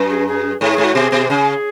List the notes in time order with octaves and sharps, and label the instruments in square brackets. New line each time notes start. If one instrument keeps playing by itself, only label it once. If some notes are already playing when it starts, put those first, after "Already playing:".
Already playing: [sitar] F#2
[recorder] G#4
G#4
[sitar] G#2 [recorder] G#4
[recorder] G#4
[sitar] G#2
[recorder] F#4
[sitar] B2 [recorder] G#4
[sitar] B2
[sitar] C#3 [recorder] G#4